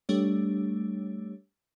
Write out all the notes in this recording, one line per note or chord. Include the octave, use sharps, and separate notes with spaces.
G3 A3 D4 G4 C#5